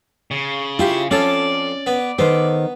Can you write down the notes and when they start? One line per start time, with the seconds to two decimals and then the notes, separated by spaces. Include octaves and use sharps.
0.31 C#3
0.79 E4 F4 G4
1.11 F2 C#4 F4 A4 D5
1.86 B3
2.18 D#3 B3 A4 C5